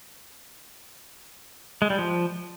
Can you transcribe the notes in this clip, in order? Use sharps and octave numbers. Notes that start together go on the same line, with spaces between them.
G#3
G3
F3